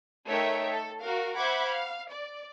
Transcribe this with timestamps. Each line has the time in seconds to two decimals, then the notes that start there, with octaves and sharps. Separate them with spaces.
0.27 A3 D#4 A#4 C#5 E5 G5
0.69 A4
1.01 F#4 A#4 F5
1.37 C5 E5 F#5 B5 D6 G#6
1.66 F5
2.10 D5